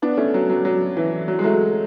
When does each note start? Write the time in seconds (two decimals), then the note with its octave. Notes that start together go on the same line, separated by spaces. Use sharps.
0.02 B3 D4
0.17 A3 C#4
0.34 F#3
0.50 F#3
0.65 F#3
0.97 E3
1.28 F#3
1.39 G#3
1.44 F#3 A3